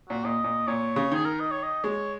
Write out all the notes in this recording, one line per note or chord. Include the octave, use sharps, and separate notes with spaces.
A#2 F#4
A#2 D#5
A#2
A#2 C#5
C#3
D#3 G#4
A#4
D#5
C#5
D#5
G#3 C#5